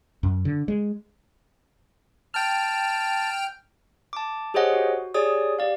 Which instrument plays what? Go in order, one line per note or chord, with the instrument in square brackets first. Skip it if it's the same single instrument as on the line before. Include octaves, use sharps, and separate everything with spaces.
[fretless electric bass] F#2
D3
G#3
[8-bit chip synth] G5 F6 [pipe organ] A5
[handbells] A5 D6
G4 G#4 C5 C#5 D#5 F#5
F#4
G4 G#4 C#5 D5 D#6
G4 D5 F5